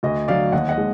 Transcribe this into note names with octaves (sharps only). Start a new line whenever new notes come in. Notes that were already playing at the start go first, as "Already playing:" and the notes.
D2 D#5
D3 F#3 D5 F5
D#2 D#5 F#5
D#5 F#5
D#3 G#3